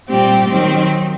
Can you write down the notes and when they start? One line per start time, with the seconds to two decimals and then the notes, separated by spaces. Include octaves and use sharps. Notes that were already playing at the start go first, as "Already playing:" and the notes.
0.08 A#2 G3 C4 G4
0.49 D#3 F#3 C4